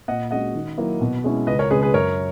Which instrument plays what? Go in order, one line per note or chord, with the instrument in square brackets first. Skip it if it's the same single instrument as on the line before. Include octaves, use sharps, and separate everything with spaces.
[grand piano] A#2 [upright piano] D#5 F#5
[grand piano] G#3 C#4 F#4 [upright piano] D#5 F#5
[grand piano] D#3
F#3 A#3 E4
B2
G#3 C#4 E4
[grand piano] C#2 [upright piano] B4 D#5
[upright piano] A#4 C#5
[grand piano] C#3 G#3 [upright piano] G#4 B4
[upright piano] G#4 B4
[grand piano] F#2 [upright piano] A#4 C#5